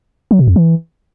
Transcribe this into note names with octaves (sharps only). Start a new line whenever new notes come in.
F#3
B2
F2
E3